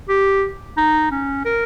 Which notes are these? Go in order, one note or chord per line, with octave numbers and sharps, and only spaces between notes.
G4
D#4
C#4
A#4